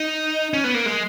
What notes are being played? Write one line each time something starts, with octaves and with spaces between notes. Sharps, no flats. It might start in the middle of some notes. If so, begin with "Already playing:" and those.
Already playing: D#4
C#4
B3
A#3
G#3